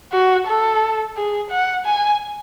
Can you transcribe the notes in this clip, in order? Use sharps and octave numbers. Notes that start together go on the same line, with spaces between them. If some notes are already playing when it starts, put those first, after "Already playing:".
F#4
A4
G#4
F#5
G#5